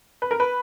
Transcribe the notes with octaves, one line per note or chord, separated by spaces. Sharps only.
B4
A#4
B4